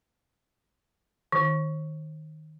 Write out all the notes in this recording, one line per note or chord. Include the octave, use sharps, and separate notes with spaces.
D#3